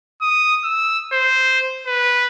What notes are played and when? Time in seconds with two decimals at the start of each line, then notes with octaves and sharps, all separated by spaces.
0.21 D#6
0.64 E6
1.12 C5
1.87 B4